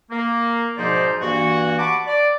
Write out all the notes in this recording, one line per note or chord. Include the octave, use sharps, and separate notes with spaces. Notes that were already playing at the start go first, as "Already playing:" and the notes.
A#3
G#2 B2 F3 D#4 C5 D5
G2 E3 A#3 F#4
F#5 A5 B5 C#6 D6
D5